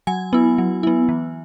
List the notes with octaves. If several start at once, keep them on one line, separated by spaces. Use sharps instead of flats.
F#3 G#5
B3 E4
F#3
B3 E4
E3